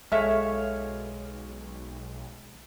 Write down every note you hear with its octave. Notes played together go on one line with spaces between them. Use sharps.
B1 G#3 A4 C#5 E5 F5